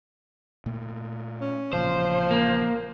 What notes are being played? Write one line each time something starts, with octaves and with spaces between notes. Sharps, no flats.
A#2 A3
C#4
A1 A#2 C#3 F3 C5
A#3